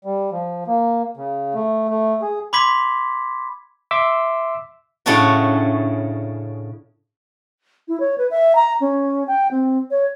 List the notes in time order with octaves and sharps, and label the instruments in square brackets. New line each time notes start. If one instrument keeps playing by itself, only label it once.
[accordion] G3
F3
A#3
C#3
A3
A3
G#4
[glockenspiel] B5 C6 D6 G#6 B6
[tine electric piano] E5 C6 D6 E6
[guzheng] A2 C#3 A3 C#4 D4 F#4
[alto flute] E4
C#5
B4
E5
A#5
C#4
G5
C4
C#5